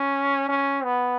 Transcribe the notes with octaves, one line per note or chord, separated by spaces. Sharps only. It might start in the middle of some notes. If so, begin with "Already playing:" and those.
Already playing: C#4
C#4
B3